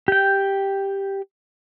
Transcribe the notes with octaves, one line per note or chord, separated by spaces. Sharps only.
G4 G5